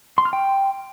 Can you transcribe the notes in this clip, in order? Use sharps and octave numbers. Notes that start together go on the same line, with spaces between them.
C6
F6
G5